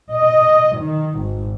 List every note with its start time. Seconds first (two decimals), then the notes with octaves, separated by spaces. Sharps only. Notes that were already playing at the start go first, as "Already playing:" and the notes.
0.12 D#5
0.78 D#3
1.20 G#1